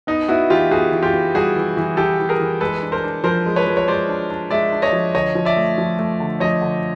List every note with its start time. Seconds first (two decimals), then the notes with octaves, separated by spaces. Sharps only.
0.07 B3 D#4
0.28 B3 E4 F#4
0.50 E3 F4 G4
0.70 B3 F#4 G#4
0.92 E3
1.03 F4 G4
1.13 B3
1.34 G3 F#4 G#4
1.56 E3
1.77 E3
1.97 E3 G4 A4
2.19 E3
2.29 G#4 A#4
2.40 E3
2.61 G#3 A4 B4
2.82 D4
2.92 A#4 C5
3.04 D4
3.24 F3 A#4 C5
3.46 G#3
3.56 B4 C#5
3.67 F3
3.77 C#5
3.87 G#3 C5 D5
4.09 D4
4.30 D4
4.51 G#3 D5 E5
4.72 D4
4.82 C#5 D#5
4.92 F3
5.15 D3 C#5 D#5
5.35 F3
5.45 D5 E5
5.56 A3
5.78 F3
5.99 A3
6.20 D3
6.40 F3 C#5 D#5
6.61 D3